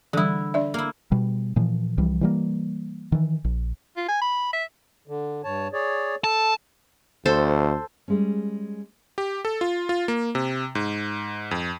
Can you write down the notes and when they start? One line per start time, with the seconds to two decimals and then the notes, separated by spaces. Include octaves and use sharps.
0.13 D3 E3 G3 E4
0.54 D4 D5 E5
0.74 A#3 E4
1.12 B2 G3
1.56 A#2 E3 F3
1.98 C2 E3 F3 G3
2.21 E3 G3 A#3
3.12 D#3 E3
3.44 A#1
3.97 F4
4.09 G#5
4.21 B5
4.53 E5
5.08 D3
5.44 G2 C#5 A5
5.73 G#4 C#5 D5
6.24 A4 A5
7.26 D2 A4 C5
8.08 G3 G#3 C#4
9.18 G4
9.45 A4
9.61 F4
9.89 F4
10.08 A#3
10.35 C3
10.75 G#2
11.51 F2